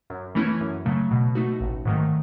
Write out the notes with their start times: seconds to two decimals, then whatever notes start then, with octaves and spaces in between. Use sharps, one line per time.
0.10 F#2
0.35 E3 A3 C#4 E4
0.61 F#2
0.86 C#3 F#3 A3
1.11 B2
1.35 A3 D#4 F#4
1.61 A1
1.85 G#2 D#3 F#3 A3